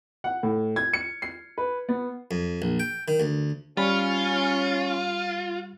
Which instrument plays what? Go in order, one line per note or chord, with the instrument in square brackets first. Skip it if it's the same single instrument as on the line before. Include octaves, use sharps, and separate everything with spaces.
[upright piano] F#5
A2
G#6
C#7
C7
B4
B3
[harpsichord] F2
A#1
G5
D#3
D2
[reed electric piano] G3 B5 [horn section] C#4 [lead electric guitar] F4